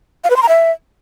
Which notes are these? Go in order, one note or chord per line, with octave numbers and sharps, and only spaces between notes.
F5
B4
C6
A#5
E5